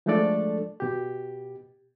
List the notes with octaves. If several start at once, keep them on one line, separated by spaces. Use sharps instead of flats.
F3 G#3 A3 D4 A4 D5
B2 G4